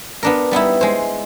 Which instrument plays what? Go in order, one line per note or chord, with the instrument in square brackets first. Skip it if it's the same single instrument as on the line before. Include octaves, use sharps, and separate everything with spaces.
[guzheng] B3 D4 A#4
G3 B3 D#4 E4
G#3 C5